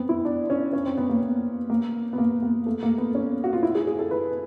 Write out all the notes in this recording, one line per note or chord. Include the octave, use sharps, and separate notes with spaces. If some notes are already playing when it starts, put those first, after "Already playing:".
Already playing: B3 C4
E4
D4
C#4
C#4
C4
B3
A#3
B3
A#3
B3
A#3
A#3
A3
A#3
B3
C#4
F#4
F4
E4
G#4
G#4
A4
B4